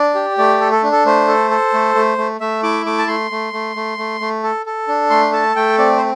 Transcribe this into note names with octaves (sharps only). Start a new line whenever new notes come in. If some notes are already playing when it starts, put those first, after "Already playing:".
Already playing: D4 D5
G4
A3 D5
A4
A4
D4
A4
A3 C5
A4
A4
A3
A3
A3
A3 E5
E4 D6
A3 D6
A5
A3 C6
A3
A3
A3
A3
A3
A4
A4
D4
A3 C6
A4 A5
A3 G5
C4 D5
C5